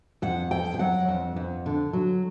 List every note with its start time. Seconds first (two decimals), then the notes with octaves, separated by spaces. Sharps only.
0.22 F2 F#5
0.51 F2 G5
0.74 G5
0.79 F#3 F#5
1.08 F2
1.36 F2
1.66 D3
1.93 F#3